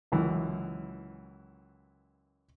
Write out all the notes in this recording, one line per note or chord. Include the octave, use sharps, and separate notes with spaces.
C#2 F#2 E3